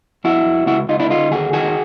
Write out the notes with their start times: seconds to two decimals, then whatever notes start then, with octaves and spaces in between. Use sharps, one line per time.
0.24 F2 E4 F#4
0.46 F2
0.67 C#2 E4 F#4
0.89 C#2 D#4 F4
1.00 D4 E4
1.10 D3 D#4 F4
1.31 D#2 F#4 G#4
1.53 D#3 F#4 G#4